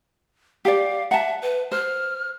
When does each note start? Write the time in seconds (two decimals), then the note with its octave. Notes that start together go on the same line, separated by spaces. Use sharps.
0.65 G4 D5 F5
1.11 E5 F#5 A5
1.42 B4
1.72 C5 F6